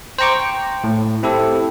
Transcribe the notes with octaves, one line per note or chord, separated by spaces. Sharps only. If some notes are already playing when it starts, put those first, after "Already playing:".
C5 G5 A#5 C#6 D6
G5
A2
C4 E4 G4 A4